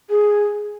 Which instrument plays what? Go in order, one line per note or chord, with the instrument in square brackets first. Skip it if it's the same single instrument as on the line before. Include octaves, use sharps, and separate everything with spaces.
[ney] G#4